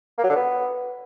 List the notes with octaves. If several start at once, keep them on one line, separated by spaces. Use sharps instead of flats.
A#3
F#3
D3
B3